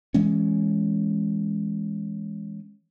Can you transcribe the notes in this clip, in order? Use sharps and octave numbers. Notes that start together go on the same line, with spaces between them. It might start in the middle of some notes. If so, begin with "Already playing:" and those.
E3 G#3 C#4